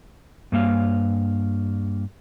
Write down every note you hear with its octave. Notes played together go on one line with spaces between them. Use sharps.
G2 A#3 F5